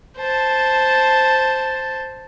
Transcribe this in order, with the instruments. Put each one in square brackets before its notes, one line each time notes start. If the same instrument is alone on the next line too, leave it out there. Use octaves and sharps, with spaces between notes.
[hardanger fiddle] C5 A5